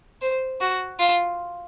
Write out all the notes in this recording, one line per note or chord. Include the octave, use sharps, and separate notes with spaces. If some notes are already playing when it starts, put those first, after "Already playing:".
C5
F#4
F4